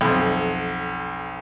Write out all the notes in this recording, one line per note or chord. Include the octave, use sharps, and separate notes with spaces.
B1 F2